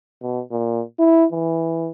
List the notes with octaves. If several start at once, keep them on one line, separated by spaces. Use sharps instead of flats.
B2
A#2
E4
E3